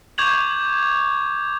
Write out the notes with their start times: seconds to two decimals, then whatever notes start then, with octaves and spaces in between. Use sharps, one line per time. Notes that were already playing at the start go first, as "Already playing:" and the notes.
0.18 C#6 D6 G6 G#6 F7 F#7